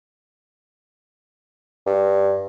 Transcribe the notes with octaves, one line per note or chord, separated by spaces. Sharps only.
G2